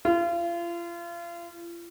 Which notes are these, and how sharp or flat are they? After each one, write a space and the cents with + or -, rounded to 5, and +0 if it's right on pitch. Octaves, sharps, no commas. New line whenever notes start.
F4 -35